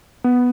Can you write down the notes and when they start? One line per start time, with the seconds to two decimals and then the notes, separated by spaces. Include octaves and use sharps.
0.24 B3